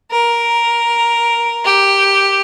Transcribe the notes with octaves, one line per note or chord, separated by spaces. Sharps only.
A#4
G4